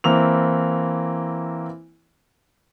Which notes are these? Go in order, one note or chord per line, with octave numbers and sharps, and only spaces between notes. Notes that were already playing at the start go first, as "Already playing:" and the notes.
E3 A#3 C4 E4 F7